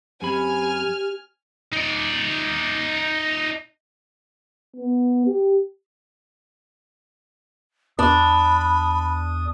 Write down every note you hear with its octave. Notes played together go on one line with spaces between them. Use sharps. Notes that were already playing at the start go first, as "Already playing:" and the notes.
F#2 C4 G4 G#5 B5 F6
D#4 D5
B3
G4
E2 D4 B5 D#6